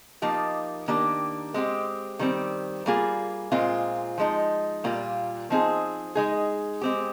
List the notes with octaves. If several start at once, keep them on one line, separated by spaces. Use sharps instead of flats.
F3 A#3 D#4 G4
D#3 A#3 D4 G4
G#3 C4 G4
D#3 G3 C4
G3 A#3 F4 G#4
A#2 G#3 C4 F4
F3 G#3 D#4
A#2 G3 A#3 F4
F3 C4 D#4 G#4
G#3 D#4 G#4
G#3 C4 G4